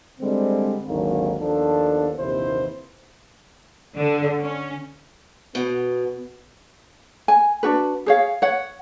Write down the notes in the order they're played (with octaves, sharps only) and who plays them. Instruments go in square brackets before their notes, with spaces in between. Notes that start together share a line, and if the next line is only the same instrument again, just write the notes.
[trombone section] D3 G3 G#3 C4
G#1 D#2 D3 F#3 A#3
D#2 F3 B3 D4 A4
A#1 D#2 C3 E3 E4 C5
[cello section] D3
C#4
[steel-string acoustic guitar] B2 [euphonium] B3
[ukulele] G#5
D4 F#4 B4
G#4 C#5 F5
C#5 F#5